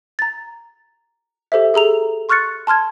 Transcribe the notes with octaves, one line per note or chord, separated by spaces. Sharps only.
A#5 A6
G4 A4 C5 E5
G#4 A4 A#5 F7
C6 C#6 F6 F#6 A6 C#7
A5 C6 F6 G#6